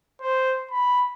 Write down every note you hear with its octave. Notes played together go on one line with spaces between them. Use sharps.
C5
B5